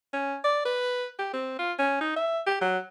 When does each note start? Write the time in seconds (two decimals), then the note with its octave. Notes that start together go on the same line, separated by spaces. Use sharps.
0.13 C#4
0.44 D5
0.65 B4
1.19 G4
1.34 C4
1.59 F4
1.79 C#4
2.01 D#4
2.16 E5
2.47 G4
2.61 F#3